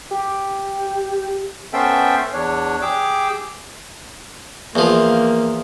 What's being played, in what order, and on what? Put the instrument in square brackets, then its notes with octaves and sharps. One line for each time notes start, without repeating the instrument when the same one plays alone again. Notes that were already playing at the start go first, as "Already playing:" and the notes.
[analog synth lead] G4
[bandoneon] B3 C#4 A4 C5 E5 G5
E2 D4 C#5
G4 G#4 D6 E6
[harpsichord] E2 F3 [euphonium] A#3